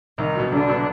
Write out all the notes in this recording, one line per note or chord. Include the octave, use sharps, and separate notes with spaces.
C2 D#3 D#4
B2 F#3
C2 D3 D4
B2 F#3